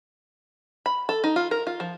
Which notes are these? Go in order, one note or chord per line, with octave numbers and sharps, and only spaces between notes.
B5
A4
D#4
F4
A#4
F4
F3